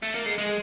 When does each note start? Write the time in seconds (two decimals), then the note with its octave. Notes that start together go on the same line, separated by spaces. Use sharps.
0.03 A3
0.15 A#3
0.26 G#3
0.38 G#3